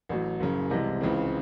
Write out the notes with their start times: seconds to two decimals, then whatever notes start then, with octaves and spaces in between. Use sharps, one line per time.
0.09 A1 A2 F#3
0.40 F#1 F#2 C#3
0.70 C2 C3 E3 G#3
1.01 C#2 C#3 E3 C4